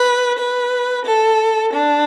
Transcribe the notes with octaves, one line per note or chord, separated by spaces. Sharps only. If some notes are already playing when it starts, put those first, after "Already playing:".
Already playing: B4
B4
A4
D4